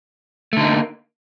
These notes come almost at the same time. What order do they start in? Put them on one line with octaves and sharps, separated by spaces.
A3 D3 D#4 A#3